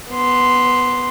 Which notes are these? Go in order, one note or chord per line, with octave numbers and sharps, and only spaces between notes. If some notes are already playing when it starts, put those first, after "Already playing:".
B3 C6